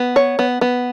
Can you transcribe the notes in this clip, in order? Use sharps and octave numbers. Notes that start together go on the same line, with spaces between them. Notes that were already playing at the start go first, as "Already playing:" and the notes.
Already playing: B3
C#5
B3
B3